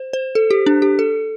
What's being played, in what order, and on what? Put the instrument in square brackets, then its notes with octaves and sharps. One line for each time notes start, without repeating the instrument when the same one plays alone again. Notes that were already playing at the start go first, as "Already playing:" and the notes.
Already playing: [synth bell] C5
C5
A4
G4
D4
G4
A4